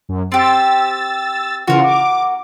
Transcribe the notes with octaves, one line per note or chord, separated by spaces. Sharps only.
F#2
C4 G4 E6 A6
C#3 E3 F4 F#4 A#4
D6